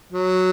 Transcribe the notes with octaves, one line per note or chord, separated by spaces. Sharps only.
F#3